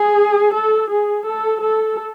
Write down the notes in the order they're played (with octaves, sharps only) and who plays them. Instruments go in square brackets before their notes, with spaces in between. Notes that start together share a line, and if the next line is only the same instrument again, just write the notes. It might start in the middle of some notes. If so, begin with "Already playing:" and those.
Already playing: [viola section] G#4
A4
G#4
A4
A4